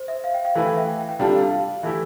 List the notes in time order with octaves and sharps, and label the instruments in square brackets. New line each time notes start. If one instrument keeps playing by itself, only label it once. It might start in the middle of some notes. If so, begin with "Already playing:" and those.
Already playing: [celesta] C5
E5
F5
G5
F5
[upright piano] E3 A3 E4 B4 [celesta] F5
[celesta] G5
E5
G5
G5
G5
[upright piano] C3 G3 D4 F4 A4 [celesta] F5
[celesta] F5
[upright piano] E3 A3 E4 G4 [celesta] E5